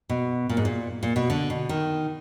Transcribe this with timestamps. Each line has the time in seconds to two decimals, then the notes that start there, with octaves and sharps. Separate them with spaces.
0.09 B2
0.49 A#2
0.57 G#2
0.65 A#2
1.03 A#2
1.16 B2
1.30 D3
1.50 B2
1.69 D#3